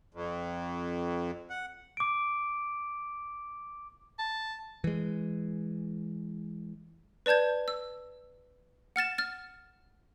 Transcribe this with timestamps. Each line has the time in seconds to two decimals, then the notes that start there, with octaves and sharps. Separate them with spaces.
0.14 F2
1.50 F#5
1.97 D6 D7
4.19 A5
4.84 E3 G#3
7.26 B4 D5 A5 G6 G#6
7.68 E6
8.96 F#5 F6 A6 E7
9.18 F6 A6